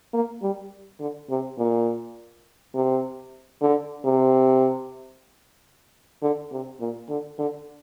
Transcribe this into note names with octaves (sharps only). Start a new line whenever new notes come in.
A#3
G3
D3
C3
A#2
C3
D3
C3
D3
C3
A#2
D3
D3